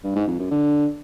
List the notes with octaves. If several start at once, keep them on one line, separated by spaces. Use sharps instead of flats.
G2
G#2
F2
F#2
D3